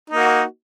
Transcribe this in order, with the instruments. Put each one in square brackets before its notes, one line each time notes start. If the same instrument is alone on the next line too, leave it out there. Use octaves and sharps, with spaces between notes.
[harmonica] D#4
A#3
F#4